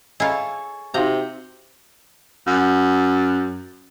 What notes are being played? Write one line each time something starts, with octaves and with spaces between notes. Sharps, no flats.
E4 F4 G#4 A4 C#5 D#5 A#5
C3 D#4 F#4 F5 A#5
F#2